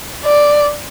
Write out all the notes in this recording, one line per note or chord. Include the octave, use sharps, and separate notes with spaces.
D5